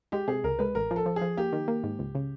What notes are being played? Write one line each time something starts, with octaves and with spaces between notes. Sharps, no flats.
G#3 G4
C3 G#4
C#2 A#4
G#3 B4
A1 A#4
F3
A4
F3
G#4
F3
A#3 G4
D#3
A#3
G#2
C#2
C#3